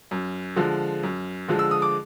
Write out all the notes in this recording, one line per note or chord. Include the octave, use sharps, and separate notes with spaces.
F#2
D3 F3 G#3
F#2
D3 F3 G#3
E6
D#6
D6